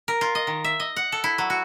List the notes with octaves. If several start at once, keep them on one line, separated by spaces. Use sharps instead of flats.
A#4
F4
D#5
D#3
E5
D#5
F#5
A4
E4
F#3
F#4